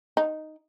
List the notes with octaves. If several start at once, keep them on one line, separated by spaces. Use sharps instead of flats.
D#4